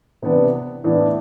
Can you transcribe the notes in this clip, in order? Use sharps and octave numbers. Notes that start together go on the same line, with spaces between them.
C3 E3 B3 D4
A2 E3 B3 D4